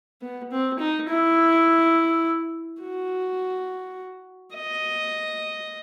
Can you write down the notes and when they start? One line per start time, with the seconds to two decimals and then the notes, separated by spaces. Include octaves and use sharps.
0.22 B3
0.52 C4
0.79 D#4
1.09 E4
2.82 F#4
4.55 D#5